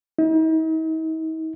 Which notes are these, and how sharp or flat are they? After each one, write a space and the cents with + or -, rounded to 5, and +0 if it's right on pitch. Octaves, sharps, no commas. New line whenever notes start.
D#4 +45